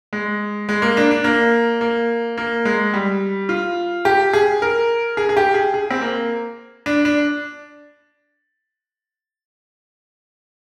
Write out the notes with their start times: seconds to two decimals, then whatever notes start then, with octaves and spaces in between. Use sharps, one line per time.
0.13 G#3
0.69 G#3
0.82 A#3
0.97 D4
1.11 D4
1.24 A#3
1.81 A#3
2.38 A#3
2.65 G#3
2.94 G3
3.49 F4
4.05 G4
4.33 G#4
4.62 A#4
5.17 G#4
5.29 G#4
5.37 G4
5.54 G#4
5.74 G#4
5.91 C4
6.01 A#3
6.86 D4
7.05 D4